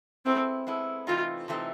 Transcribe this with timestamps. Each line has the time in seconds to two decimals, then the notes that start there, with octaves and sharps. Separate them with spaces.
0.25 G#3 B3 C4 E4 A4
0.67 G#3 B3 E4 A4
1.07 C3 E3 A3 C4 D#4 F4
1.48 C3 E3 A3 C4 D#4